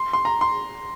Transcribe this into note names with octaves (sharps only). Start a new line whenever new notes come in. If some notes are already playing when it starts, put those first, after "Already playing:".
Already playing: C6
C6
A#5
C6